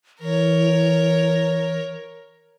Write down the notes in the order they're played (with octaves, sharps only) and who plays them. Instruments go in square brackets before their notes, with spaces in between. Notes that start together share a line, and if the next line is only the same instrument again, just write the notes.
[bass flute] E3 [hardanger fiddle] A#4 C#5